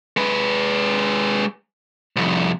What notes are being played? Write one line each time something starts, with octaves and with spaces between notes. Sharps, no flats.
G#3 B4
C2 F2